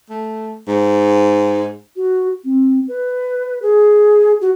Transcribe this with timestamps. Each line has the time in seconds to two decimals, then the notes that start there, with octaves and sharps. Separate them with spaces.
0.10 A3
0.68 G#2
1.96 F#4
2.44 C4
2.88 B4
3.62 G#4
4.41 F#4